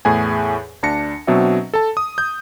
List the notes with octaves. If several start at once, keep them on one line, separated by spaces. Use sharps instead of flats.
E2 A2 G#4 G#5
D2 D4 A5 A#6 C#7
B2 F#3 C4 D4 E5
A4 A5
D#6
G6